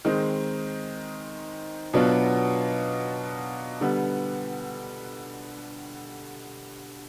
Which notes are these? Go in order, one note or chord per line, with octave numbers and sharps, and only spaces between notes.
D#3 G#3 C4 D#4
B2 F#3 B3 D4 F4
D3 G3 B3